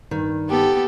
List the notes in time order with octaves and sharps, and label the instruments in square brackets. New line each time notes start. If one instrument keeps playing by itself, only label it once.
[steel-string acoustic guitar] G2 D#3
[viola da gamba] B3 G4 A4